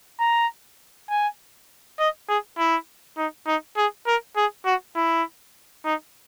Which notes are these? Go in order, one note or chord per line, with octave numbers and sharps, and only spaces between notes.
A#5
G#5
D#5
G#4
E4
D#4
D#4
G#4
A#4
G#4
F#4
E4
D#4